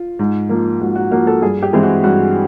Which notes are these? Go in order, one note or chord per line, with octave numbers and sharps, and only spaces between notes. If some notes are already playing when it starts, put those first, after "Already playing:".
Already playing: F4
G#2
F3 A#3
G#2 F#4
F#4
F3 A#3 F#4
A4
G2 G#4
G4
E3 G#3 C4
F#4
G2 F#4